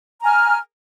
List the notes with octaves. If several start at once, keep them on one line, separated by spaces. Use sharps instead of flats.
G#5 A#5 F6